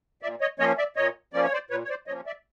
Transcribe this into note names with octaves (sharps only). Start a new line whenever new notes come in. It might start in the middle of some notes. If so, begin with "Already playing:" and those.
A#2 D5 E5
C#5 D#5
F3 A#3 C#4 C#5 D#5
D5 E5
A#2 C#5 D#5
F3 A#3 C#4 D5
C#5
C5 D5
A#2 B4 C#5
C#5
C5 D5
F3 A#3 C#4 C#5 D#5
D5 E5